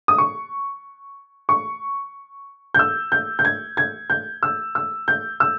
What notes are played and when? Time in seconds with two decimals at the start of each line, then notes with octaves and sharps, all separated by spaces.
0.08 D#6
0.18 C#6
1.49 C#6
2.74 G6
2.79 E6
3.12 G6
3.39 G6
3.45 G#6
3.77 G#6
4.10 G6
4.43 E6
4.75 E6
5.08 G6
5.40 E6